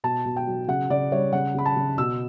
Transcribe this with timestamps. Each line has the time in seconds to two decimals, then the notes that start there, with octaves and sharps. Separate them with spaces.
0.04 B2 A5
0.25 B2
0.36 G5
0.47 F#3
0.68 C#3 F#5
0.90 C#3 D5
1.12 G3 C#5
1.33 C#3 F#5
1.55 C#3 B5
1.66 A5
1.76 C#3
1.98 B2 E6